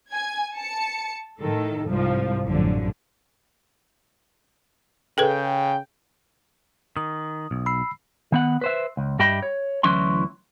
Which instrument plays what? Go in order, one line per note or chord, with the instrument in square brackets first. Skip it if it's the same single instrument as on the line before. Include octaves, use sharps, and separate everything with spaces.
[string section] G#5 G#6
A5 C#7
A2 D#3 A4
C2 G#2 F3
A1 F#2 D3 F3
[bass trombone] C#3 [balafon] G#4 A4 B4 [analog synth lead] G5
[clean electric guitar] D#3 [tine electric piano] D#6
[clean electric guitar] B1
[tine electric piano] B5 E6 C7
[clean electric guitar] D#3 B3 F#5
B4 C5 E5
C#2
G2 G4 D#5 E5 G5 B5
C#5
D2 E3 F#3 C#4 E4 C6